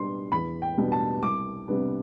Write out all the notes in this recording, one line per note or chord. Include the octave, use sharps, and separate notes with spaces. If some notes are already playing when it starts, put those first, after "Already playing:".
Already playing: B2 G3 D4 C6
E2 B5
G5
B2 G3 D4
A5
C2 D6
C3 G3 B3 D4